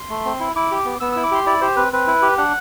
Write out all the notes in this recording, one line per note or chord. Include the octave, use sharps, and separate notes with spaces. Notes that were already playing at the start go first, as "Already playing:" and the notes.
Already playing: C6
A3
C4
E4
E4 D6
G4
B3
B3 E6
E4 E6
D6
G4 C6
E4 D5
G4 C5
C4 B4
C4 B4
E4
G4
D4 F#5